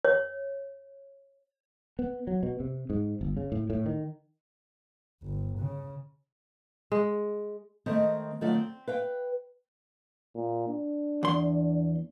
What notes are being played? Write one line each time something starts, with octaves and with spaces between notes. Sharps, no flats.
C#5
B3
F#3
B2
C3
G#2
G1
C#3
A2
A2
D#3
G1
C#3
G#3
D#3 G#3 A3 C4 D#5
D#3 F#3 A3 F4 D5
C4
B4 F5 G5
A#2
D4
E2 C6